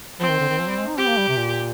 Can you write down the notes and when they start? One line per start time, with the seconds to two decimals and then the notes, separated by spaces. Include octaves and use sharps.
0.20 F3 C4
0.29 D#3
0.40 D3
0.49 D#3
0.59 F3
0.68 G3
0.78 G#3
0.88 D#4
0.98 C4 G4
1.08 A#3
1.18 G3
1.28 C3
1.37 A#2